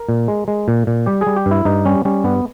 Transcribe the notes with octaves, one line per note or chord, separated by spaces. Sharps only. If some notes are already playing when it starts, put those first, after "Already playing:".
Already playing: A#4
A#2
G#3
G#3
A#2
A#2
G3 G4
G#4
G3
G4
G2
E4
G2 D#4
G3 C#4
G3 C#4
G2 B3